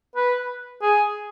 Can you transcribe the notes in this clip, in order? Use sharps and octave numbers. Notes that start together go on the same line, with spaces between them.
B4
G#4